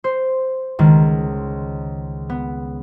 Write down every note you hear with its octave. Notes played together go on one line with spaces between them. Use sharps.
C5
C#2 D#3
B3